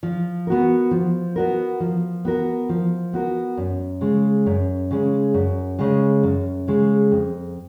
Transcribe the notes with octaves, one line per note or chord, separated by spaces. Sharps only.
F3
B3 F#4 A#4
F3
B3 F#4 A#4
F3
B3 F#4 A#4
F3
B3 F#4 A#4
F#2
C#3 G#3
F#2
C#3 G#3
F#2
C#3 G#3
F#2
C#3 G#3
F2